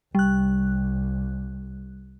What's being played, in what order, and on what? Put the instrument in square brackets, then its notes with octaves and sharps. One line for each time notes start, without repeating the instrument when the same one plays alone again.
[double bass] C2 [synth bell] G3 F#6